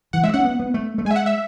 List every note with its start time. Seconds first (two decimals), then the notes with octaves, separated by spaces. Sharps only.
0.13 E3 F#5
0.23 G#3 E5
0.34 C#4 F#5
0.45 B3
0.60 B3
0.74 A3
0.98 A3
1.05 G#3 G#5
1.11 E5
1.16 F#5
1.26 E5